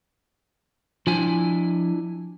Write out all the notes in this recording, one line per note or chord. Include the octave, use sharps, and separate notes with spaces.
F3 D4 E4 G#5